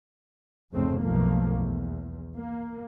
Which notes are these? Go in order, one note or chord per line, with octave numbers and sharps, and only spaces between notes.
F1 A#1 G#2 C#3 A3 C4
B1 G2 F3 A3 A#3
E2
A#3